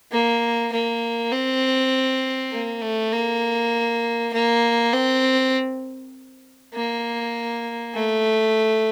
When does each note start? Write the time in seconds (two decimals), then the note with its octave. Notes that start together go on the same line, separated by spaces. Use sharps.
0.12 A#3
0.72 A#3
1.32 C4
2.52 A#3
2.82 A3
3.12 A#3
4.33 A#3
4.93 C4
6.74 A#3
7.94 A3